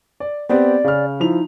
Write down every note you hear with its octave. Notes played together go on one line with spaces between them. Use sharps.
D5
B3 C4 G4 D5
C#3 F6
F3 D#4 E4 F7